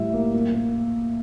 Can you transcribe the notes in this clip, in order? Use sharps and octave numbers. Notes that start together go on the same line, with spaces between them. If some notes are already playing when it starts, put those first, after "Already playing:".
Already playing: A2 G3 E5
A#3
A#3
A#3